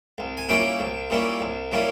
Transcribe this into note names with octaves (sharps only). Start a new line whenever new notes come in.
C2
G#5
A#2 G3 C#4 E4 G5
C2
A#2 G3 C#4 E4
C2
A#2 G3 C#4 E4